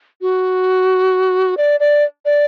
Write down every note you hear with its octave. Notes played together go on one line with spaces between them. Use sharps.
F#4
D5
D5
D5